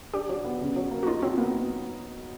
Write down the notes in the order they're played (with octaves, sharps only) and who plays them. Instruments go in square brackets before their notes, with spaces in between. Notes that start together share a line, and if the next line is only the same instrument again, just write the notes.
[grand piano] D4 [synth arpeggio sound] G4
[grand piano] F#3
B3
C#3
F#3
A#3
[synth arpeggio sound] F#4
[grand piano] D#4 [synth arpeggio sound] F4
[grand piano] F#3 [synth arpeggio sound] C4
[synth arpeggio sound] A#3 [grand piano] B3